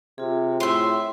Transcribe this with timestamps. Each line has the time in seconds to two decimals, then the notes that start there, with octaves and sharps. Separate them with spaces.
0.18 C3 F4 G#4
0.60 A2 E5 C6